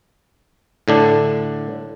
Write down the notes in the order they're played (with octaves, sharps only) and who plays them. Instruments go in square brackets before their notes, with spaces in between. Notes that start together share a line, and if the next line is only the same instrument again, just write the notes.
[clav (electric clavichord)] A2 D3 D4